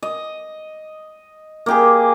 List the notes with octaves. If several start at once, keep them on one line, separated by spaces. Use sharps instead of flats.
D#5
A#3 G4 G#4